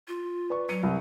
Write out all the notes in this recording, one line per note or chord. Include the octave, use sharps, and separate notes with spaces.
F4
B4 D5 C#6
F#3 C#7 D#7
C2